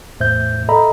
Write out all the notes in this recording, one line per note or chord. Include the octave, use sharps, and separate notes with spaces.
E2 A2 C5 E5 G6
A4 D#5 E5 A#5 B5